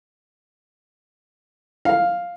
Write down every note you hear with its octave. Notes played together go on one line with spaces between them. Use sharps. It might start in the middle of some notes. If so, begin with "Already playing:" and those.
F5